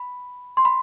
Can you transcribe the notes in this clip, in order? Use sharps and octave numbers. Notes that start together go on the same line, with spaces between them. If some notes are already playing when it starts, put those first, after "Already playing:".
Already playing: B5
C6
B5